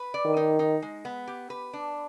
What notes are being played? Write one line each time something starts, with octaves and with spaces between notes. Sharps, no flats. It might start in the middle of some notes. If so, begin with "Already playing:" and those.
Already playing: B4
D5
D#3
D#4
D#4
G#3
B3
G4
B4
D4